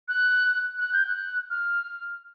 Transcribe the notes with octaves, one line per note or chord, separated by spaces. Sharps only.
F#6
F#6
G6
F#6
F6